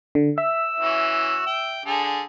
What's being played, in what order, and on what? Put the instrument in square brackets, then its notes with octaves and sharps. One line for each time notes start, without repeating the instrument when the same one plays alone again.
[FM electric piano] D3
[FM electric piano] E5 [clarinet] E6
[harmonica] E3 C#4 F#4
G5
D3 G#4 A4